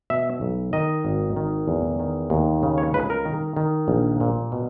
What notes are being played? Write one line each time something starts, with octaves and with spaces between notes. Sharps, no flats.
B2 E5
B1
D#3 D#5
G#1
D#3
E2
D#3
D#2
C#3
C#5
C#2 B4
A#4
D#3
D#3
A#1
A#2
B2